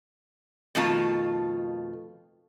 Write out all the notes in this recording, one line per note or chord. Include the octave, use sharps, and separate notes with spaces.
F2 B2 D#3 A3 F4 A5